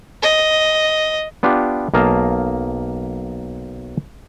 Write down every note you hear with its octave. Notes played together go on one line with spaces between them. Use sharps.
D#5
B3 D4 F4 G4
B1 A#3 D#5 F5 A5